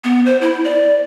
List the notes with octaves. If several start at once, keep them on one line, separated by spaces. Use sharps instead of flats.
B3
C5
E4
D5